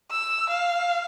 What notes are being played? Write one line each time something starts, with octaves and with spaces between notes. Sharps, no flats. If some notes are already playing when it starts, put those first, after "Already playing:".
E6
F5